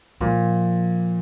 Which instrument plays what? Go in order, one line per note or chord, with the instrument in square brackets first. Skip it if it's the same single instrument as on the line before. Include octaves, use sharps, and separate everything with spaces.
[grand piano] A#2 [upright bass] F3